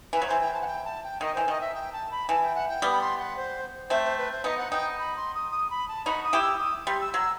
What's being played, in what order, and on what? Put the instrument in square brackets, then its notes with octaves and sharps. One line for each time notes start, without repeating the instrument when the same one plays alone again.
[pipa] E3 [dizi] B4
[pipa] F#3
[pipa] E3 [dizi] C5
[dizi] G5
A5
F#5
G5
A5
G5
[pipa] D#3 [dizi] D#5
[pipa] E3 [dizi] C5
[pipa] D#3 [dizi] D#5
[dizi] E5
G5
A5
B5
[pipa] E3 [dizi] A5
[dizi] G5
F#5
G5
[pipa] G3 B3
[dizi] B5
C6
F#5
C5
[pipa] A3 C4 [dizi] C5
[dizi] C5
B4
C5
[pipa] B3 D#4 [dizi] D#5
[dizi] F#5
[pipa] B3 D#4 [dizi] G5
[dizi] B5
C6
D#6
D#6
B5
A5
[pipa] D#4 F#4 [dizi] B5
[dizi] D#6
[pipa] E4 G4
[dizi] E6
D#6
[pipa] G3 [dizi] C6
[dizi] E6
[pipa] F#3 [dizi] E6